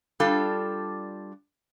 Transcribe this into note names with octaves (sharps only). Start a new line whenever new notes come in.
G3 D4 F4 A4